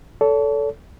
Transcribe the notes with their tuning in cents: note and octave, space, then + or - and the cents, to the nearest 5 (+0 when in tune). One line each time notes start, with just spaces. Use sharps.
A4 +0 C#5 +45